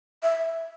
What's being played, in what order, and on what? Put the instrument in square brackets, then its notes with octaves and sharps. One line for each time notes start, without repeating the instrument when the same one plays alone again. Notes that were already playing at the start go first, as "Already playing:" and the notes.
[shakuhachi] E5